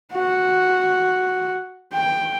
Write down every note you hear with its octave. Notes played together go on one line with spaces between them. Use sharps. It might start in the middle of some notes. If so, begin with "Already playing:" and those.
F#4
G5